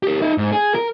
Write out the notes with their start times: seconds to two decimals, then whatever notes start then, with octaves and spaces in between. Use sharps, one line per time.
0.03 G4 A#4
0.22 D#4 E5
0.38 G#2
0.52 G#4
0.75 A#4